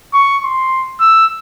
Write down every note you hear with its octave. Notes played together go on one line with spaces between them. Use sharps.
C#6
C6
E6